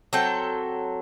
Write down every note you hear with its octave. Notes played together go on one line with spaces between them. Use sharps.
F#3 C4 A4 G5